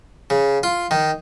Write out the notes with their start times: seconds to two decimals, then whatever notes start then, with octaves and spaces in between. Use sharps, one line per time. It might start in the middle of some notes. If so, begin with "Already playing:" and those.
0.30 C#3
0.63 F4
0.91 D#3